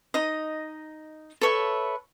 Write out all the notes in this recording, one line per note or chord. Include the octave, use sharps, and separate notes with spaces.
D#4 D#5
A4 B4 C#5 E5